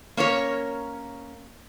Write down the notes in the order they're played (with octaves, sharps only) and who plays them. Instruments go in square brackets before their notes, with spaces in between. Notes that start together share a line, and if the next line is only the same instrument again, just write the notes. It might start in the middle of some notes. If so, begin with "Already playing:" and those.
[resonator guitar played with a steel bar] A#3 C#4 A#4 C#5